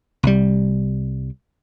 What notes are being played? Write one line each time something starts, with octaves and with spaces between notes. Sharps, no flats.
C2 G3